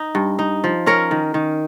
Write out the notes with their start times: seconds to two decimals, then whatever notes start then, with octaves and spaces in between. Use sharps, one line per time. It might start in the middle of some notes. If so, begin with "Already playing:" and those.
Already playing: D#4
0.15 G2
0.39 D#4
0.64 F3
0.86 C#4 A#4 C#5
1.11 D#3
1.34 D#3